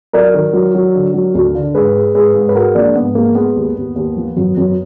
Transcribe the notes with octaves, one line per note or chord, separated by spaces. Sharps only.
F#3 A#4 D5
D#3
F#3
F#3
D3
F#3
D2
D3
G#2 G#4 B4
G#3
G#2 G#4 B4
G#2
B4
G#3 F#4 A#4
F3 A#3 D4
G#2 B3
G#3 A#3
G#3 B3
D#2
D#2
D#2
F3
F#2
F#2